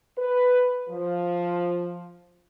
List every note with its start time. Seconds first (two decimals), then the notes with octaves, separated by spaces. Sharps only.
0.17 B4
0.89 F3